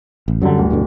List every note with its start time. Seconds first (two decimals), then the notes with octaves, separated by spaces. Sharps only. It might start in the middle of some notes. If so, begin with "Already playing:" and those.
0.28 A1
0.42 F#2 D3 F#3 G3
0.58 D1
0.70 G2 B2 D3